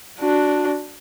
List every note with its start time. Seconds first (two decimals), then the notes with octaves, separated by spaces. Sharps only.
0.19 D4 F#4